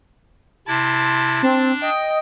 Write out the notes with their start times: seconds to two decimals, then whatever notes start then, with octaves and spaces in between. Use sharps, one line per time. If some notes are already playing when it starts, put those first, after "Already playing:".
0.67 C3 E4 A5 C6
1.43 C4 D4
1.82 D#5 G5